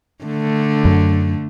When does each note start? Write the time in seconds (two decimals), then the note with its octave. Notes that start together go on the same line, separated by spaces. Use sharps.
0.24 D3 A3
0.85 F#2